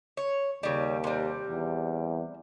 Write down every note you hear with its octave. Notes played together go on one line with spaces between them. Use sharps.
C#5
D#2 C#3 G3
C3 G3
E2